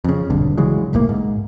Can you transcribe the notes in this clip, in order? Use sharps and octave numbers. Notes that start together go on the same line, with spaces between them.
F2 C#3
D#1 B1 G2 D3
C#3 E3 F#3 G#3
D1 B1 A2 A#3
G#2